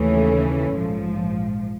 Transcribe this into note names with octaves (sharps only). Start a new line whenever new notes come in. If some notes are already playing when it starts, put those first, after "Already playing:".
Already playing: D#2 C#3 E3 A3 C#4
A#1 G#2 F3